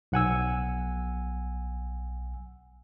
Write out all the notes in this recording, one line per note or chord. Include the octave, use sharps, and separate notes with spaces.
B1 F#5 G#5 E6